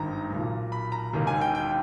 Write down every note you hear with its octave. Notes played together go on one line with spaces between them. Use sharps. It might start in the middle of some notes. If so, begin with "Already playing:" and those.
Already playing: G#1 G2 D#3 A#5
B1 A#2
B5
A#5
E1 D#2 D#3
G#5
G5
G5